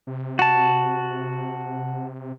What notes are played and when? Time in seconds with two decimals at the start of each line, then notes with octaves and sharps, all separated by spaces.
0.07 C3
0.39 F#4 A5